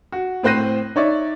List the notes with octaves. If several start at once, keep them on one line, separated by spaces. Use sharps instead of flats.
F#4
A2 C4 C5 F#6 A#6 D#7
D#4 C#5 D5 E5